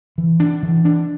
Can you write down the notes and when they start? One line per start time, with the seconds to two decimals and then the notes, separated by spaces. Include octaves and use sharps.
0.18 E3
0.40 D4
0.63 E3
0.85 D4